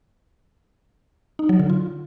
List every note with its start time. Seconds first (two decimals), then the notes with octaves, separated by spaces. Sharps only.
1.39 D#4
1.49 F#3
1.59 D3
1.70 F4